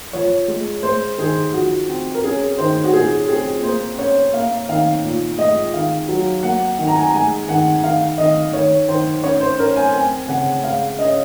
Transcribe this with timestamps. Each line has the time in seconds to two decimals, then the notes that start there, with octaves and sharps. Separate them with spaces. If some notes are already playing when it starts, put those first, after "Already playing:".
0.13 F3 C#5
0.48 G#3
0.83 G#3 C5
1.18 D#3 G#4
1.53 F3 F#4
1.89 C4
2.14 A#4
2.23 C#4 G#4
2.58 D#3 C5
2.84 F#4
2.93 A#2 G#4
3.28 C4 G#4
3.63 A#3 C5
3.98 C#4 C#5
4.34 A#3 F5
4.69 D#3 F5
5.04 A#2
5.38 G#3 D#5
5.73 D#3 F5
6.09 F#3
6.43 A#3 F#5
6.78 D#3
6.87 A#5
6.95 G#5
7.03 A#5
7.14 G#3 G#5
7.48 D#3 F#5
7.83 D#3 F5
8.18 D#3 D#5
8.53 D#3 C#5
8.88 D#3 C5
9.24 C#4 C#5
9.41 C5
9.58 C#4 A#4
9.76 G#5
9.93 C4 G#5
10.28 C#3 F#5
10.63 G#3 F5
10.99 C#4 D#5